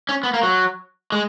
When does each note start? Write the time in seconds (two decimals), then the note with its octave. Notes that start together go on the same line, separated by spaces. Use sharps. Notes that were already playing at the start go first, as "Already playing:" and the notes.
0.09 C#4
0.23 B3
0.34 A#3
0.43 F#3
1.12 G#3